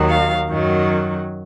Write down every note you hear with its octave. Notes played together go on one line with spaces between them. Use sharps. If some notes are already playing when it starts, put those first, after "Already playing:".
Already playing: D#2 D#3 F#3
F5
F#2 D#3 F#3